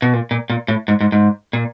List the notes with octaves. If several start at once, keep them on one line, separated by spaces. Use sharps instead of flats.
B2
A#2
A#2
A#2
A2
G#2
G#2
G#2
A#2